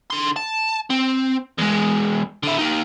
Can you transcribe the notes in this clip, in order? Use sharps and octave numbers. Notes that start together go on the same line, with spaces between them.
D3 C6
A5
C4
E2 G#3
D3 E4
A#3 D#4